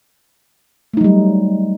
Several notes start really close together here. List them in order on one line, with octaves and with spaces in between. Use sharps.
A3 D#4 F#3 G3